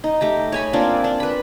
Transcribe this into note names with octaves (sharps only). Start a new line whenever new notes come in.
D#4
A3 G4 A#5
C#5 G#5 B5
A#3 C4 D4 F4
D4
B4 B5